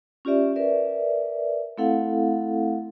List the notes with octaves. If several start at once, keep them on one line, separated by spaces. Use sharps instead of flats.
C#4 F4 G4 D5 E5
A#4 B4 D5 E5
A3 C4 E4 A4 F5 F#5